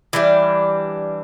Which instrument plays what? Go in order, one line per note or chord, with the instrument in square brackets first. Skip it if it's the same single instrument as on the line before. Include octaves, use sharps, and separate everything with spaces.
[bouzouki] E3 G3 D4